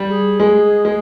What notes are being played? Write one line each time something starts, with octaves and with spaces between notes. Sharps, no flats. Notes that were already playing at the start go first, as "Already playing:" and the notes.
Already playing: G3
G#4
G#3
G#3